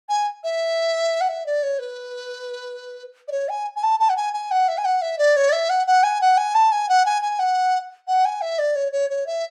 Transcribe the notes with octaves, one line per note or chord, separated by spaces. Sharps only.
G#5
E5
F#5
E5
D5
C#5
B4
D5
C#5
G#5
G#5
A5
A5
F#5
G#5
G#5
F#5
E5
G#5
F#5
E5
D5
C#5
D5
E5
F#5
F#5
G#5
F#5
G#5
A5
G#5
F#5
G#5
G#5
F#5
F#5
G#5
E5
D5
C#5
C#5
C#5
E5